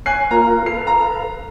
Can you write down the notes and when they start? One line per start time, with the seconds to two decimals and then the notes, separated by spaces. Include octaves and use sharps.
0.06 C#5 G#5 F#6 C7
0.31 A#3 F4 A#4 A#5
0.66 A4 B4 F5 C7
0.87 A#5